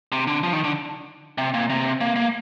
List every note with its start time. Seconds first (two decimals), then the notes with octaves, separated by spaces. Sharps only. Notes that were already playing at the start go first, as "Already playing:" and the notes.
0.12 C3
0.27 D3
0.43 F3
0.53 D#3
0.64 D3
1.38 C3
1.54 A#2
1.70 C3
2.01 A#3
2.16 A#3